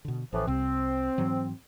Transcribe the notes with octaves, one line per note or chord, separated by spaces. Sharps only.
B2 D3
A1 A2 E3 F3
C2 C3 C4
G#2 E3 F#3